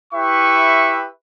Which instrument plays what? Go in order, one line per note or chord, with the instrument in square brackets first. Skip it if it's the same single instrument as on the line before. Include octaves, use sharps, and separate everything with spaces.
[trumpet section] E4 G4 B4 E5 G5 C#6